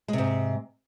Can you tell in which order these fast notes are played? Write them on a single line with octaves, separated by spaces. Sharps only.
G#3 C3 G#2